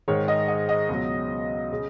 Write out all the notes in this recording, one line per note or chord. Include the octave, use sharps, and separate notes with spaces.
G#2 D#3 G#3 C#5
D#5
D#5
D#5
C#2 B2 F#3
C#3